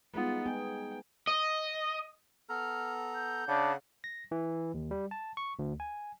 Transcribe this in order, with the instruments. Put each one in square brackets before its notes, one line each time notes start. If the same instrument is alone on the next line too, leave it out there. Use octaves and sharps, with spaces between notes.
[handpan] G3 G#3 D#4 [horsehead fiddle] B3 F4
[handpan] B3 G#4 [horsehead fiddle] G5
[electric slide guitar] D#5
[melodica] B3 A4 A#5 [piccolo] F6
[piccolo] G6
[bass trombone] C#3 [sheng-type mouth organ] D4 [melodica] F#5
[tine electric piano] A#6
E3
D#2
G3
A5
C#6
D2
G#5